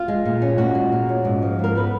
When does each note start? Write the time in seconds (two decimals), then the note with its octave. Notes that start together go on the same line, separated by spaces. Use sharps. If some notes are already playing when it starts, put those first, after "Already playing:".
Already playing: F4
0.08 G#3
0.25 A#2
0.42 C#4
0.58 A#2 F#4
0.75 G#3
0.92 A#2
1.09 C#4
1.25 G#2
1.42 F3
1.59 G#2 A#4
1.75 B3 B4